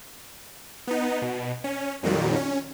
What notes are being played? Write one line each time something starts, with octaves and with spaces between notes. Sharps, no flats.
B3 D#4
B2
C#4
F2 A#2 D#3 F#3 G3
C#4